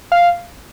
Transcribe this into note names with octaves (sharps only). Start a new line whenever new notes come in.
F5